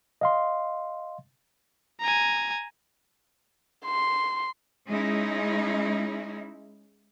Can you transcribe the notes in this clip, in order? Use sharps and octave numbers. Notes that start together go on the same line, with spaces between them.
D#5 F5 C6
G#5 A#5
C6
G#3 C#4 D#4 E4